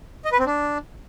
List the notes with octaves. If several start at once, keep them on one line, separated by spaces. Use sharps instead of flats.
D#5
B4
C4
D4